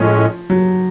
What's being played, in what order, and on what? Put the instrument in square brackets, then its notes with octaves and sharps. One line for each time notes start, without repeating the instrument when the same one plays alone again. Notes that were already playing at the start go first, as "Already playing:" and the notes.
Already playing: [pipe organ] A2 G#3 C#4 [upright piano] F3
[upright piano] F#3